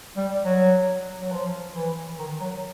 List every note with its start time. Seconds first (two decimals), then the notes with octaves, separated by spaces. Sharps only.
0.17 G3
0.45 F#3
1.21 F#3
1.32 F3
1.75 E3
2.19 D#3
2.41 F#3